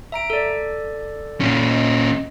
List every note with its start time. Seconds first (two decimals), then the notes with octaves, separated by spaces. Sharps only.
0.12 E5 A#5 D7
0.30 A4 D5
1.41 A#2 C#4
1.67 D#5